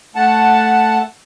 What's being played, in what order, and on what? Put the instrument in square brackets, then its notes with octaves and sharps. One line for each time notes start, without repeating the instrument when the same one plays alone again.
[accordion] A3 F#5 A5